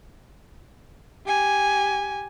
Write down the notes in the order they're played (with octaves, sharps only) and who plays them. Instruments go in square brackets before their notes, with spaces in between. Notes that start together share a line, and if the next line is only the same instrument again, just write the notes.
[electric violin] G4 G#5